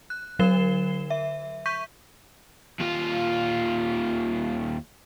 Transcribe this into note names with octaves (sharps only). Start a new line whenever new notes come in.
F#6
D3 F#3 A#4 C7 E7 G7
E5
C#6 G6 B6 D#7
D#2 F4